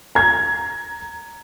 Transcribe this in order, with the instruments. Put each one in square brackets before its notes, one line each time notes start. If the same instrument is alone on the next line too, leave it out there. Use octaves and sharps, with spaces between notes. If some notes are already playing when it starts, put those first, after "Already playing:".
[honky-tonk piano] A#5 G#6